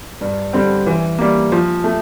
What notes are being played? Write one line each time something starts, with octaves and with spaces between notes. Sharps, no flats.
G2
D3 G3 C4
E3
G3 A#3
F3
A3